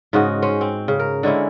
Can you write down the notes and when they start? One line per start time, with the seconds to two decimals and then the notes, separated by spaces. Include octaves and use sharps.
0.13 G#2 C#3 F#4 D#5
0.42 C#4 C5
0.61 C4
0.88 C#3
0.99 A#4
1.23 D3 G#3 C#4 E4